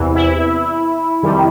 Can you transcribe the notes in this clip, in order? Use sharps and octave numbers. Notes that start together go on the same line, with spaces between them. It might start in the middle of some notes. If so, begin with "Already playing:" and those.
Already playing: E2 C3 E3
E4
F2 C3 D#3 G3